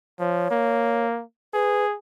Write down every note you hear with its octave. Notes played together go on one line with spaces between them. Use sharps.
F3 C#5
A#3
G#4 B4